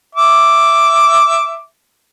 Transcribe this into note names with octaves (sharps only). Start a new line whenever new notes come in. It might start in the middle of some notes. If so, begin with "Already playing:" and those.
E5 D6